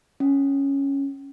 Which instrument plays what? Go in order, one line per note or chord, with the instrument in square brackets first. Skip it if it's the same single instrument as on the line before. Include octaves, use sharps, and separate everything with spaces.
[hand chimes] C#4